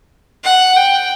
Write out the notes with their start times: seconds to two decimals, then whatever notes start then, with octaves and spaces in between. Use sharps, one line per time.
0.44 F#5
0.76 G5